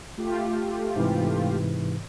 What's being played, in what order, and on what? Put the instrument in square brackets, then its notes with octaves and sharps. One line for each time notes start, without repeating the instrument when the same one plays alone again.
[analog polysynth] A3 F4 G4
[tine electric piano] G#2 C3 E3